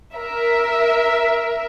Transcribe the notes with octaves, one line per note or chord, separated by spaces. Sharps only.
A#4 E5